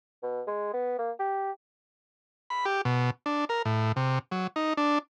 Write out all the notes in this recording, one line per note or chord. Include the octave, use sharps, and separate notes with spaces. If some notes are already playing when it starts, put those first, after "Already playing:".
B2
G#3
B3
A#3
G4
B5
G4
B2
D4
A#4
A2
C3
F#3
D#4
D4